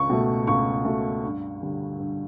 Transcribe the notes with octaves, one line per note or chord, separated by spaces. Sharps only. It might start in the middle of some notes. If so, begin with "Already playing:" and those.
Already playing: C#2 C#6
B2 A3
C#2 C#6
B2 A3
G2
D3 G3
G2